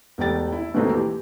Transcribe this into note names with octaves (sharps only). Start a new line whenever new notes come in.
E1 A3 G4 G5 A6
E4
D#2 G#2 B2 A3 C4 D#4
E3 G4